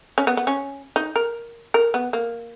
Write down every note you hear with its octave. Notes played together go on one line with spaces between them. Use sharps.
C#4
B3
B3
C#4
D#4
A#4
A#4
B3
A#3